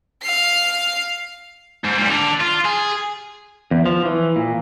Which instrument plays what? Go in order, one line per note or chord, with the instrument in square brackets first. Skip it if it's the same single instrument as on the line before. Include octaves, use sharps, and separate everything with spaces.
[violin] F5 C7
[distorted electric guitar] G#2
A#2 G3
D3
F4
G#4
[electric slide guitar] E2
F3
E3
A#2